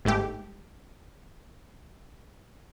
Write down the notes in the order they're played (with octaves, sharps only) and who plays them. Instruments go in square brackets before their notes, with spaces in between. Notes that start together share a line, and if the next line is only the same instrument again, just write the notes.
[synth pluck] G1 G#2 A3 G4